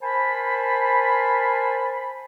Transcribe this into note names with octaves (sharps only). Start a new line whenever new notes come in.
A#4 C5 G#5 A5 B5